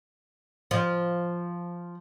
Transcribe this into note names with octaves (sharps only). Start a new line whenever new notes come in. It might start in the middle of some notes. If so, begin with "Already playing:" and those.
F3